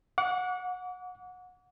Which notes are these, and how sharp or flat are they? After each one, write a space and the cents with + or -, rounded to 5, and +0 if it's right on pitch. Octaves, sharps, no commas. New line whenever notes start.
F#5 -25 D6 -45